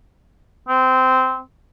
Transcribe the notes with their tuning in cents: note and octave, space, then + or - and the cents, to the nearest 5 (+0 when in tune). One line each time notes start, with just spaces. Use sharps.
C4 -15